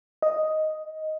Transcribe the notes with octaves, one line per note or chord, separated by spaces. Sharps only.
D#5